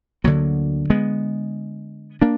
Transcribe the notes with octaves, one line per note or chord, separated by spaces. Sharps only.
D2 D3 F#3 A#3
G#3 B3
A#3 D4